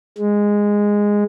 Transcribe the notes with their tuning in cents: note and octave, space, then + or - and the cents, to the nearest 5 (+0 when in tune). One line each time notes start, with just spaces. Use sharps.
G#3 -10